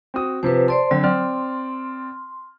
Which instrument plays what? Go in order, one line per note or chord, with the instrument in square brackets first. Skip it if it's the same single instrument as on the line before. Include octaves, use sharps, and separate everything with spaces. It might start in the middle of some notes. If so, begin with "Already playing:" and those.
[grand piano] C4 F#4 D#6
[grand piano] C3 F3 [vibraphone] B4 C5
[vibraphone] C5 D5 C6 [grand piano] A5
[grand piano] D3 C4 [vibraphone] F#3
[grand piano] C4 D5 F6 [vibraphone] C6